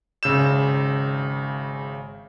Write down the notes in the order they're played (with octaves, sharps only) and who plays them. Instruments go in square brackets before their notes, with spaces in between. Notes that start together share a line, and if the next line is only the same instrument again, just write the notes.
[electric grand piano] G#1 C#3 E6 G6 E7